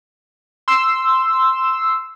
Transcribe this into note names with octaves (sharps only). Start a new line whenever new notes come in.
C6 E6